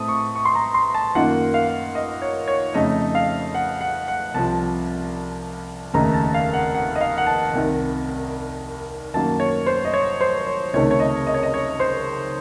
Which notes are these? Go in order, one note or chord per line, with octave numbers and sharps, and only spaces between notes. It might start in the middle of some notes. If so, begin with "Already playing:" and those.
Already playing: A2 A3 C4 D#6
C#6
C#6
C6
A#5
C6
A5
F#2 D#3 A#3 F4 F#5
F5
D#5
C#5
C#5
F2 C#3 A3 D#4 D#5
F5
F#5
F#5
F#5
C2 C3 F3 A5
F1 D#2 C#3 A3 D#4 A#5
A5
F5
F#5
F#5
D#5
F5
F#5
A5
C2 C3 D#3
F#2 D#3 F#3 A#3 A5
C#5
C5
D#5
C#5
C5
C#5
C#2 C3 D#3 A3 C#5
C#5
D#5
D#5
C#5
D#5
C#5
C5